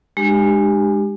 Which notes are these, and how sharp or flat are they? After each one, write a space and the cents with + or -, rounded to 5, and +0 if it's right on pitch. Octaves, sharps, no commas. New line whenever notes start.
G#3 -10 D4 +40 G4 +0